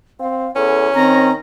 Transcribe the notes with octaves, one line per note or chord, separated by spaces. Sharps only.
C4 F5
E2 C#4 A4
D#3 C4 A#5